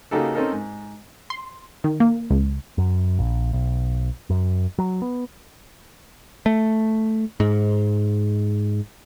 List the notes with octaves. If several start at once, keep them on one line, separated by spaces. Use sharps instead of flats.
C#3 A#3 D#4 F#4 G4 A4
C4 C#4 D#4 A4 A#4
G#2
C6
D#3
A#3
C#2
F#2
A#1
B1
F#2
F#3
B3
A3
G#2